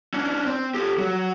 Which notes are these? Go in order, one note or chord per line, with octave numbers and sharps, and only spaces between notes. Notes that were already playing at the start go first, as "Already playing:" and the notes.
C#4 D4
C4
G4 A4
F#3